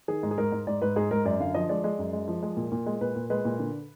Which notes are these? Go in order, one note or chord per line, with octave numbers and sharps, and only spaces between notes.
D#3 G#4
G#2
G#4
G#2 A#4
G#2
G#2 D5
G#2 B4
G#2 G#4
G#2 A#4
F#2 D5
D3 F5
F3 D#5
G#3 D5
G#3
F#2
G#3
F3
G#3
A#2
A#2
G#3
A#2 B4
A#2
G#3 B4
A#2
D3